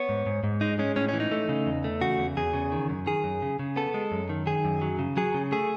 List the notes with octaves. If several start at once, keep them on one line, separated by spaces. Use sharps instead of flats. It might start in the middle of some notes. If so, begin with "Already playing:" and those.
Already playing: B3 C#5
G#2
G#2
G#2
G#3 D#4
G#3 C#4
A2 C#4
C#4
E3
D#4
A3
C#3
E2
A3
C#3 F#4
E2
E2 G#4
C#3
D#3
F#2
D#3 G#4
F#2
C#3
C#3
B3 A4
G#3
F#2
D#3
D#3 G#4
F#2
F#3
C#3
F#3 G#4
C#3
A3 G#4